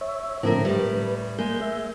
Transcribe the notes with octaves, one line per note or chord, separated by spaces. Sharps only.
C#5 E5
A2 D3 F3 A#3 C4 A#4
A2 G3 B4
G#3 A#3 G6
E5